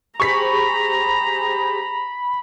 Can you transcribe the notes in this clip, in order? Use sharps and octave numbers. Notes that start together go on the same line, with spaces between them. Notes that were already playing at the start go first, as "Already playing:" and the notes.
G4 G#4 C5 A#5 B5 C#6 B6